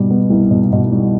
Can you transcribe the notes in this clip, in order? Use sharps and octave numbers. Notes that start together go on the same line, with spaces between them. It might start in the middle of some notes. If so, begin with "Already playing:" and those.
Already playing: B2 G3
B3
C2
B2
B2
G3